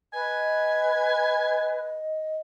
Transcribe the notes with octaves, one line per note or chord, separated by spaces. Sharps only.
B4 D#5 G#5